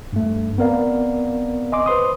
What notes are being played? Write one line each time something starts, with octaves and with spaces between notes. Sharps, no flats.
G2 A3
B3 C4 A#4 D5 F5
D#5 G#5 C6 D6
B4 C5 C6 D#6